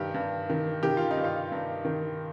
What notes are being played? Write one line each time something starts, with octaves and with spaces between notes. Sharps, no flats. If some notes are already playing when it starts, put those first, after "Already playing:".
Already playing: G2 D#3 G4
G2
D#3
D#3 G4
F4
D#4
G2
F4
G2
D#3